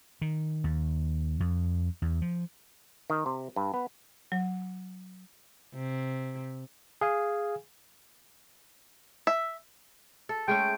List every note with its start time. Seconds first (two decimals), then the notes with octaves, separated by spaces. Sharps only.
0.21 D#3
0.64 D#2
1.40 F2
2.02 E2
2.22 F3
3.10 D#3
3.26 C3
3.56 G2
3.74 B3
4.32 F#3
5.75 C3
7.01 G#4 F5 G#5
9.27 E5
10.29 A4
10.48 G#3 A3 C#4 G5